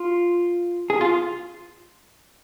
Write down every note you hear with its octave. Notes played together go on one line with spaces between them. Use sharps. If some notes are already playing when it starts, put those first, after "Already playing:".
Already playing: F4
G#4
F4